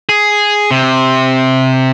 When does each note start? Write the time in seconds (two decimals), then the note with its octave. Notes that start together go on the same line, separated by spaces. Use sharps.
0.09 G#4
0.71 C3